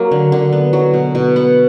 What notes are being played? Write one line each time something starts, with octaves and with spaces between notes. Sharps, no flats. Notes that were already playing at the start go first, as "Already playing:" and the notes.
Already playing: F#3 A#3
D3
D3
B3
F#3
B2
B2
B3 F#5